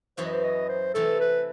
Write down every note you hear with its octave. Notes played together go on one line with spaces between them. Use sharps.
F#2 E3 B3 F#4 C5
D#5
C5
D#5
C5
C3 E3 A3 A4
B4